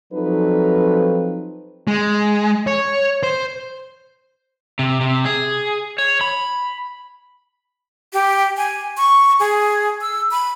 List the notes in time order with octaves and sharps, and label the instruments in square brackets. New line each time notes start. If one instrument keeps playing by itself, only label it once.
[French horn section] F3 F#3 C4 D#4 A4 B4
[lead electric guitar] G#3
C#5
C5
[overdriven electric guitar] C3
C3
G#4
C#5
B5
[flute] G4
G#5
C#6
G#4
E6
B5